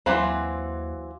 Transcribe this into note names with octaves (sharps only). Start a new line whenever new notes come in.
D#2 E3 F#3 C4 F5 C6 D6